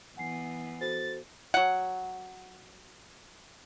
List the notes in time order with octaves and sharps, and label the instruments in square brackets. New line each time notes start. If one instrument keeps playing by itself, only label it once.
[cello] E3 B3 [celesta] F#5 G#5 C7
[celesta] F#4 A4 C5 [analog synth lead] A6
[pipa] F#3 F#5